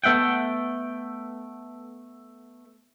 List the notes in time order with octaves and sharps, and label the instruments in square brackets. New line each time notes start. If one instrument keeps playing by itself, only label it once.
[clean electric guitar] A3 B3 E5 F#5 G5